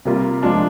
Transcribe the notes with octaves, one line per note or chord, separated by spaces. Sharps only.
C3 G3 A#3 F4
F3 G#3 D4 F4